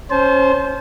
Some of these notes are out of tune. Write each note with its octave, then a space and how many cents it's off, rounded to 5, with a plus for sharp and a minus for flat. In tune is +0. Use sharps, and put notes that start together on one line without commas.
C#4 +0 C5 +0 A5 -40